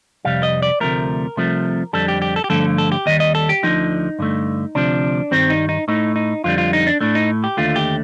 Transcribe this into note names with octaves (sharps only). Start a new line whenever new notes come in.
F2 C3 G3 F5
D#5
D5
D2 C3 F3 A3 A#4
C2 C3 F3 A3
F2 D3 G3 A4
G4
G4
A4
G4
G2 D3 F3 A3 A4
A4
G4
D#2 D#3 G3 D#5
D#5
A4
G4
D2 D3 F3 A3 D#4
G2 D3 A3
D2 C3 F3 D4
G2 D#3 G3 C4
D#4
D#4
A2 A3 D#4
D#4
F2 D3 G3 F4
F4
D#4
D4
A2 A3 D4
D#4
G4
D#2 D3 A3 F4
G4